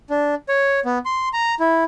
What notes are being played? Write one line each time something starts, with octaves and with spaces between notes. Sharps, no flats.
D4
C#5
B3
C6
A#5
E4